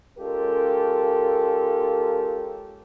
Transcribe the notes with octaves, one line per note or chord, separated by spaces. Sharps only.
G#3 C#4 F4 G4 A4 A#4